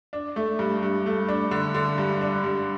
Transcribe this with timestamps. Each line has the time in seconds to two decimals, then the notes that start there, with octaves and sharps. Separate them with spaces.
0.13 D4
0.36 A3
0.59 G2
0.83 G2
1.06 A3
1.29 D4
1.51 D3
1.74 D3
1.98 G2
2.21 D4
2.44 G2